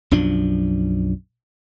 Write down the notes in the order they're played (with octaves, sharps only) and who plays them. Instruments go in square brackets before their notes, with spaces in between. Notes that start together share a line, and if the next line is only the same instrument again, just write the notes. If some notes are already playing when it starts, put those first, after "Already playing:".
[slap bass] B1 F#2 F3 D4